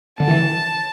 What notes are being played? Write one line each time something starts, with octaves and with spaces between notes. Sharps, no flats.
D3 A5
E3